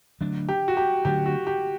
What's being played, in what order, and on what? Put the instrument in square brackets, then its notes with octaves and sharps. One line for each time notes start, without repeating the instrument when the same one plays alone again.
[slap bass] D3 F#3 A3 D4
[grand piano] G4
F#4
G4
[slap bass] D3 F#3 A3 D4 [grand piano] G4
[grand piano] F#4
G4